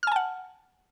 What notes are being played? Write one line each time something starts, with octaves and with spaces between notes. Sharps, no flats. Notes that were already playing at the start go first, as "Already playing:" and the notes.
F#5 G#5 A5 F6